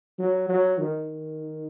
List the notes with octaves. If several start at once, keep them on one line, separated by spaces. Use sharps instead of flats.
F#3
F#3
D#3